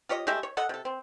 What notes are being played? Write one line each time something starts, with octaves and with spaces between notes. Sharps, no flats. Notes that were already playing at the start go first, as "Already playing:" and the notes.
F4 G4 C#5 D#5
G#3 A3 G4 E5
C#5
A4 D#5 F#5
C3 A4
C4